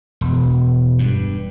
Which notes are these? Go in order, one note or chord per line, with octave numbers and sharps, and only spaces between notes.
E1
G2